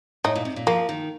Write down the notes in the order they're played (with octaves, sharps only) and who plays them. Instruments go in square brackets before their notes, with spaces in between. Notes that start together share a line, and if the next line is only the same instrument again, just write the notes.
[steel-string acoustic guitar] A2 [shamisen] D#4
[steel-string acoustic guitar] A#2
C3
A#2
[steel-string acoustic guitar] F3 [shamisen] A#3
[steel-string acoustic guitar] D#3